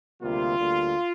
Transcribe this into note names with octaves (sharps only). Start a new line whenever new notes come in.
D2 C3 G3 A#3 F4
D2 D3 G3 A#3